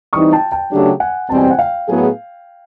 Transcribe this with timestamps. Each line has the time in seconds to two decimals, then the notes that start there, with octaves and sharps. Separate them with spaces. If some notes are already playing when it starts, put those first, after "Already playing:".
0.13 E3 G3 C4 D#4 C#6 D#6
0.33 G5 A5
0.52 G5 A5
0.71 C#3 F#3 A3 D4 G4
1.00 F#5 G#5
1.29 E2 B2 G3 C4 A5
1.37 G#5
1.44 G5
1.50 F#5 G#5
1.59 F5 G5
1.88 A2 F#3 B3 E4 G#4